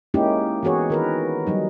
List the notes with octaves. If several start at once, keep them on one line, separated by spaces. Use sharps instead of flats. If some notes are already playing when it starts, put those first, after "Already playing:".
G#3 A#3 C#4 D#4 E4 G4
E3 B3 F#4 G#4 C#5
D#3 A#4 B4
F#3 G3 D#4